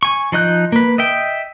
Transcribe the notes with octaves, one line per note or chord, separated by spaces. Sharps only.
G#5 C#6
F3 D#4 D#5 F#6 G6
A#3 B4
D#5 E5 G5